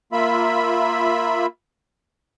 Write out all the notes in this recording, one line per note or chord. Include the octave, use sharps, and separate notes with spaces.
A#3 F4 E5 B5